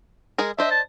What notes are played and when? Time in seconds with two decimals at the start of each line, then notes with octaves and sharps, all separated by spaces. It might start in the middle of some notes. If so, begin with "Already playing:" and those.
0.38 G#3 G#4 A#4
0.59 D4 C5 D#5 E5
0.71 A5